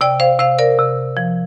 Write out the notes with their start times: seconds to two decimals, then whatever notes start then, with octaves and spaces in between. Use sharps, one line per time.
0.01 C3 D5 G5
0.20 C5 F5
0.39 C3 C5 F5
0.59 A#4 D5
0.79 C3
1.17 F3